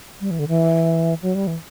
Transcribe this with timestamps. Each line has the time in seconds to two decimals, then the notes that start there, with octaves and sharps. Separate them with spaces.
0.21 G3
0.31 E3
0.39 D3
0.48 E3
1.22 F#3
1.35 G3
1.47 E3